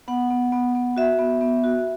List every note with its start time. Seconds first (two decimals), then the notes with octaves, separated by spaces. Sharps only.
0.08 B3 F#5
0.31 B3
0.52 B3
0.75 B3
0.97 F#4 E5
1.19 B3
1.41 B3
1.64 F#4